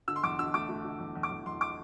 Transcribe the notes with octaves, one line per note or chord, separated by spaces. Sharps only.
D3 E6
C6
E2 D6
D3 E6
A3 D6
A3
D3
E2
E2
D6
E2
E2 C6
D6